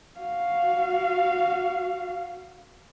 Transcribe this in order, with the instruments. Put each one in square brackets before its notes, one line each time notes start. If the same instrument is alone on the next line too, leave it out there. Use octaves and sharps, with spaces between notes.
[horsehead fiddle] F#4 F5